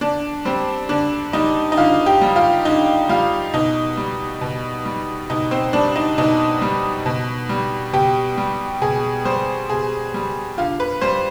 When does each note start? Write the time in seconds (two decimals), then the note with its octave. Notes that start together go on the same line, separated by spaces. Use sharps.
0.01 D3 D4
0.45 G3 C4
0.89 D3 D4
1.33 G3 D#4
1.72 D#4
1.77 D3 F4
2.06 G4
2.22 G3
2.36 F4
2.65 D3 D#4
3.09 G3 F4
3.54 B2 D#4
3.97 G3
4.41 B2
4.86 G3
5.30 B2 D#4
5.51 C4
5.73 G3 D4
5.96 D#4
6.18 B2 D#4
6.62 G3
7.06 B2
7.49 G3
7.93 B2 G4
8.38 G3
8.81 B2 G#4
9.25 G3 C5
9.70 B2 G#4
10.14 G3
10.58 D3 F4
10.80 B4
11.01 G3 C5